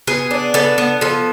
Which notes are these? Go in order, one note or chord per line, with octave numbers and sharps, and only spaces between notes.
B3 G#4
D4
B3 A4
B3
F3 A4